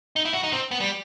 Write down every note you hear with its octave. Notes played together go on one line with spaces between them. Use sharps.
D#4
E4
F#4
D#4
C4
B3
G3